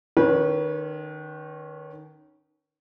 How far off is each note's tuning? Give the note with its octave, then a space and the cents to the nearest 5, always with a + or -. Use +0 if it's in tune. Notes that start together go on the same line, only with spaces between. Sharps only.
D#3 -25 C#4 +5 B4 -35